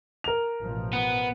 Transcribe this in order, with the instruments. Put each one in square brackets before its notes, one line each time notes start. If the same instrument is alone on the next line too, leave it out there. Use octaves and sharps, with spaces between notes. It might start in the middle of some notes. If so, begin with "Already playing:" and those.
[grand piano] A#4 F7
[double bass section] A1 B2 F3
[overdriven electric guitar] B3